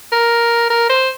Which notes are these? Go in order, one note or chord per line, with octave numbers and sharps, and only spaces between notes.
A#4
A#4
C5